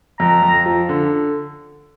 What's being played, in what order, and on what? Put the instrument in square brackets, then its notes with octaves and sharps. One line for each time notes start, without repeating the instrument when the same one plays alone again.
[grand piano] F2 [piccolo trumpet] A#5
[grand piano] F2
F3
D3